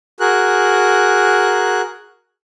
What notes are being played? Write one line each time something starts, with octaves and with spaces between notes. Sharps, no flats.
F#4 G#4 A#4 F#6